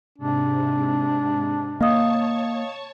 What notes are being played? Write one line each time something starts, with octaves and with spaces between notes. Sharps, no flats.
G#2 C3 D4
A#3 C#5 D#5 F5 A5 C#6 D#6